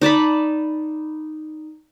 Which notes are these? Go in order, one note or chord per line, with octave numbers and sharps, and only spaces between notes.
D#4 D5 A5 B5